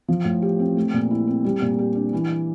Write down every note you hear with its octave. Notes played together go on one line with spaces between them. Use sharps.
F3
A2
G4
C4
A3
A#2
E4
C4
G3
A#2
G4
D4
E3